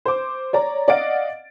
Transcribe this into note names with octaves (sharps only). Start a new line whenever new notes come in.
C5 D6
C#5 D5 A#5
D5 D#5 F5 F#5 A6 D7